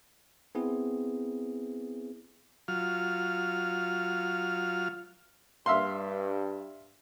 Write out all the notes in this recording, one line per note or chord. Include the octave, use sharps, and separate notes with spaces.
B3 C4 E4 G#4
F#3 F4 F6
G2 E5 F5 C6